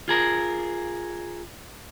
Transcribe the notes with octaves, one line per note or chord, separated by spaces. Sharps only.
F4 G#4 A#4